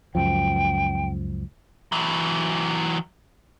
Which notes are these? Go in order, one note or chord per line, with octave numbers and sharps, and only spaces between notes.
C#2 F#2 F3 G5
E3 F#3